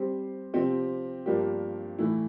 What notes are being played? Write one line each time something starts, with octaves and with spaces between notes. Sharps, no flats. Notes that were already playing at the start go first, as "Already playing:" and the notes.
Already playing: G3 C4 G4 C5
C3 F3 C4 G4
G2 F3 A#3 D4 G4
A2 E3 A3 E4